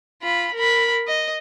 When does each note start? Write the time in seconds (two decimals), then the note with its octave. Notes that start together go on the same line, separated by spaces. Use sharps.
0.22 F4 B5
0.54 A#4 B5
1.07 D#5